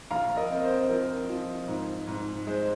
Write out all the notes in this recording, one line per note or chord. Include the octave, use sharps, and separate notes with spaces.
A#1 F5 A#5
A#4 D#5
C4
C5
F3 A#4
F3
G#2
G#2
G#3 C5